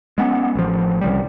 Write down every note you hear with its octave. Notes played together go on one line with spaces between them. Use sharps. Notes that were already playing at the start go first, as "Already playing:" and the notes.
G#3 B3 C#4
A1 F3
C2 C#3 G3